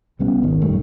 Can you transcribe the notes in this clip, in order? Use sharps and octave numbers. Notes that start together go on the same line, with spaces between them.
C#2 G3 B3 C#4
G#1 D#3
A#1 F#2 G3 A3